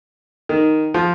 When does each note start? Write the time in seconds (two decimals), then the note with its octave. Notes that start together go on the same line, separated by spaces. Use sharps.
0.49 D#3
0.94 F3